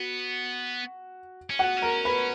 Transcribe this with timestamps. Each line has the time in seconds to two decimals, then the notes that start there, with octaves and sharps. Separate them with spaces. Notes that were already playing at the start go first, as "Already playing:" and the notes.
Already playing: B3 F#4
1.50 C#4
1.59 B3 F#4 F#5
1.77 C#4
1.82 A#4 A#5
2.05 B4 B5